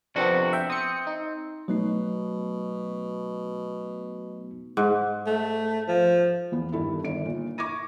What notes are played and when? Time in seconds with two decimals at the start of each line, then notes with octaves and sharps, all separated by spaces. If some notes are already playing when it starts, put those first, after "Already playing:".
0.16 F2 C3 B3 C4 D4 F#4
0.53 E5 G5
0.70 C4 D#6 C#7
1.07 D#4
1.68 B2 F#3 A3 D#4
4.77 G#2
5.27 A3
5.88 F3
6.52 E2 B3
6.72 G2 D#3 E4 A4
7.04 G1 D#3 D5 D7
7.26 A#2
7.58 C#6 D6 G#6 A#6 D#7